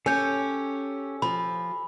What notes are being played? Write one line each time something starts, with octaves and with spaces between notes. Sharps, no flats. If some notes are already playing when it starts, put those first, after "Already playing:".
C#4 G4 A4 C#5 G#5 G6
F3 B5